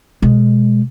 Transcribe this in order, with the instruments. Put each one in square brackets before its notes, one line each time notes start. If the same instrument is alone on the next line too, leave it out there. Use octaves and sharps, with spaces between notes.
[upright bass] B2 G#3